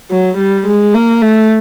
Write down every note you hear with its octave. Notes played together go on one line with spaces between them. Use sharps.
F#3
G3
G#3
A#3
A3